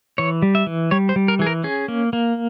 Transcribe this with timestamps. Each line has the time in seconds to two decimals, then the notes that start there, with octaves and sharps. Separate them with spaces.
0.18 E3 C#5
0.42 G3
0.55 E5
0.67 E3
0.91 G3 C#5
1.09 C5
1.16 G3
1.28 A#4
1.39 E3 G#4
1.47 A#4
1.64 C#4 G#4
1.88 A#3
2.13 A#3